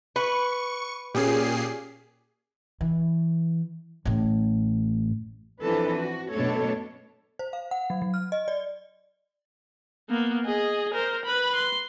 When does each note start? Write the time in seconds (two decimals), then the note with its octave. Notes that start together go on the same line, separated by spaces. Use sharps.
0.16 B4 C#6
1.14 A#2 C#4 G4 G#4 C7
2.81 E3
4.05 A1 A2
5.63 E3 F3 C4 D4 A4 B4
5.98 F#4
6.32 F#2 B2 A3 D4 A4 C#5
7.39 C5
7.53 F5
7.71 F#5
7.90 F#3
8.02 F#3
8.14 F6
8.32 D#5
8.48 D5
10.10 A#3 B3
10.46 G#4 D#5
10.94 A#4 C5
11.26 B4 B5
11.56 C6